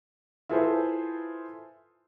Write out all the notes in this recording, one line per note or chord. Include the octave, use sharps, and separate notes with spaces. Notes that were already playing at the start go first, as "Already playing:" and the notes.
E4 F4 G#4 A4 B4 C5